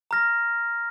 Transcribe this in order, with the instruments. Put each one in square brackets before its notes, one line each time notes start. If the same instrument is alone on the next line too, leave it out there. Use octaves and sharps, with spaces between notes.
[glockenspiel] A#5 F6 A#6